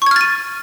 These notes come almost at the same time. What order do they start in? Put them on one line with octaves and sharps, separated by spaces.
C#6 G#6 F6 A6 D#7